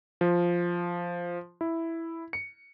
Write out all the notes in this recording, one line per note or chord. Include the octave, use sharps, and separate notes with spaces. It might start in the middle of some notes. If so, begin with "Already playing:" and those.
F3
E4
C#7